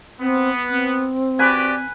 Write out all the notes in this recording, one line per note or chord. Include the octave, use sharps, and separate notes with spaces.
B3 C4
C4
F#4 G4 B4 D5 G#5